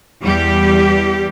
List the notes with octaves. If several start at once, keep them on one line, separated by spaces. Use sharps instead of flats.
E2 G3 G4